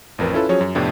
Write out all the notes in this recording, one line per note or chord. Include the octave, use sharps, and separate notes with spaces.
A1 F2 A#4 B4
C#4 E4 F4 A4 B4
F3 F#3 C#4 G#4 C#5
F#2
F2 A2 C3 B3 D4 E4